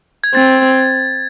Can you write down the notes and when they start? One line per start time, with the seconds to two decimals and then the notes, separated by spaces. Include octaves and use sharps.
0.24 G#6
0.34 C4 A6